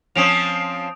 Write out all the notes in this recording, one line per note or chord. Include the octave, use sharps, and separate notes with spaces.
F3 C4 C#4 D#6 D7 F7